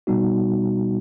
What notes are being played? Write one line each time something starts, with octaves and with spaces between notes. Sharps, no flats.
B2 G3 B3 D#4 F#4